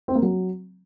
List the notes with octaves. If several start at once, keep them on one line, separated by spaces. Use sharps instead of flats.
C4
A#3
F#3